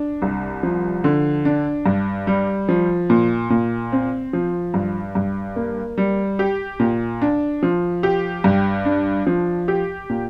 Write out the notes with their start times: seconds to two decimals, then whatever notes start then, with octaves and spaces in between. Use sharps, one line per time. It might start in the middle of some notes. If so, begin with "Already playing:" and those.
Already playing: D4
0.22 C2
0.63 F3
1.04 D3
1.45 D4
1.86 G2
2.27 G3
2.69 F3
3.10 A#2
3.50 A#2
3.92 C4
4.33 F3
4.74 G2
5.15 G2
5.56 A#3
5.98 G3
6.39 G4
6.80 A#2
7.22 D4
7.63 F3
8.03 G4
8.44 G2
8.85 D4
9.27 F3
9.68 G4
10.10 A#2